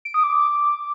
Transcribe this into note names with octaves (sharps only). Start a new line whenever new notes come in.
D7
D#6
D6